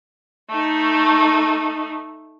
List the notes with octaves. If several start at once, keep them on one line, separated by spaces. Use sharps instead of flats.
A3 D#4